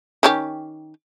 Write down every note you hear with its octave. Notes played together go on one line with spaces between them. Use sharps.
D#3 C#4 G4